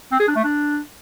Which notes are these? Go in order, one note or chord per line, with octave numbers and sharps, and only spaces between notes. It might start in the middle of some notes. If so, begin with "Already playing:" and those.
C4
G#4
D4
A3
D4